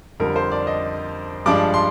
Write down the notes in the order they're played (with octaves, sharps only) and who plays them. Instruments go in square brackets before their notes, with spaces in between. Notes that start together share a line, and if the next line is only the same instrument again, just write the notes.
[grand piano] F2 D3 G3 A#4
C5
D5
D#5
G2 F3 G#3 D4 D6
C6